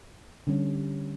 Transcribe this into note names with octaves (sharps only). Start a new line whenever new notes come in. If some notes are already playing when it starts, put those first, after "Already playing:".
D3 G3 C#4